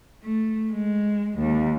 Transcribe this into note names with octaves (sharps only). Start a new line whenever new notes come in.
A3
G#3
D#2